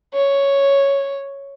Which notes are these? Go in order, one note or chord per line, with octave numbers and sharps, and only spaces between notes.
C#5